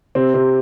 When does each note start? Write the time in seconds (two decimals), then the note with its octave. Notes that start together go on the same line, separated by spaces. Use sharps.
0.15 C3 C4
0.34 C3 C4